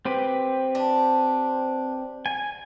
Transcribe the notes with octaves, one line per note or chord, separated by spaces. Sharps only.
C4 G4 B4
D4
G#5